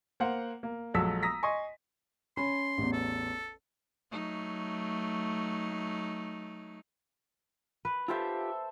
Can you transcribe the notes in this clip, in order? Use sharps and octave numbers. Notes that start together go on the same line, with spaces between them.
A#3 C5 F#5
A#3
A#1 F#3 G#3 A4 E6 B6
A#5 D#6 E6 A#6 B6
D#5 G#5 C6 C#6
C#4 B5 C6
A1 E2
A4
F#3 A3 D#4
B4
F4 G4 A4 C5 E5